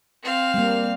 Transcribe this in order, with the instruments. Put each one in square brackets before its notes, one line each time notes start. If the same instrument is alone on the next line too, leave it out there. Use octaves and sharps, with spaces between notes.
[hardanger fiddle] C4 F5
[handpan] G3 A#3